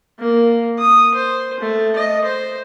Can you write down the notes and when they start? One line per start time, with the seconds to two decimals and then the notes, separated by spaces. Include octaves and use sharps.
0.19 A#3
0.79 D#6
1.15 C5
1.60 A3
1.96 D#5
2.25 C5